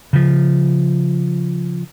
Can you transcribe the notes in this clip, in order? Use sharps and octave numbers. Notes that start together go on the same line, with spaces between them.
C#3 F3